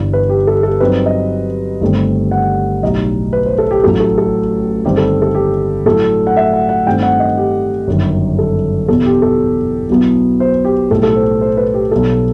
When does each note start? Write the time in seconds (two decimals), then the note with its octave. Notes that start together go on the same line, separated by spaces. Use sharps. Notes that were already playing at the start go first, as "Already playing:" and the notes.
Already playing: G1 G2 E3
0.13 B4
0.29 G4
0.47 A4
0.63 A4
0.80 G2 F#3 C4 D#4 B4
1.06 D#5
1.81 G1 G2 D#3 A3 C4
2.31 F#5
2.83 B1 A2 G3 D#4 D#5
3.33 B4
3.46 C5
3.58 A4
3.71 G4
3.84 A1 A2 F#3 A4
4.00 A4
4.18 A4
4.85 G1 G2 D#3 G3 C4 G4
4.97 A4
5.22 A4
5.35 G4
5.86 A2 F#3 A3 E4 A4
6.27 F#5
6.37 E5
6.53 F#5
6.69 F#5
6.87 G2 D#3 A3 C4 G5
7.03 F#5
7.20 D#5
7.38 G4
7.88 G1 F#2 D#3
8.39 A4
8.88 E2 B2 G3 A4
9.06 G4
9.22 A4
9.89 B1 B2 F#3 B3 E4
10.40 C5
10.65 G4
10.90 B1 A2 G3 A4
11.03 A4
11.16 C5
11.41 C5
11.57 B4
11.74 G4
11.91 B1 B2 G3 A4